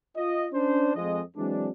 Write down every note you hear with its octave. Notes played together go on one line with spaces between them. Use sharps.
F4 D#5
C#4 D4 C5
F2 G#3 D#5
E3 F#3 G#3 C4 D4